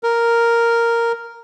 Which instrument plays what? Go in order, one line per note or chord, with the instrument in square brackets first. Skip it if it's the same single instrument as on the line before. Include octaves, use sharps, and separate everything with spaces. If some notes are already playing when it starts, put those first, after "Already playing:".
[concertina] A#4